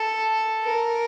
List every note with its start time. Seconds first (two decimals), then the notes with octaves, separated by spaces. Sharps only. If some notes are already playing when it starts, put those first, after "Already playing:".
Already playing: A4
0.63 A#4